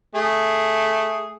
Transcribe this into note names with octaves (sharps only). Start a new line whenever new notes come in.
A3 G#4